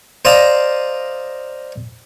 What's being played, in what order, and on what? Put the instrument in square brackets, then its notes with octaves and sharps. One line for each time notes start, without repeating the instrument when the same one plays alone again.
[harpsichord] C5 D5 D#5 F5 G#5 A#5